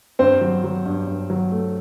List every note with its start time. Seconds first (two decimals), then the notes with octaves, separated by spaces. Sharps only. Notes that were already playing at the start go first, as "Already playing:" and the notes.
0.19 G2 C4 C5
0.41 F#3
0.64 F#3
0.86 G2
1.07 G2
1.30 F#3
1.51 A3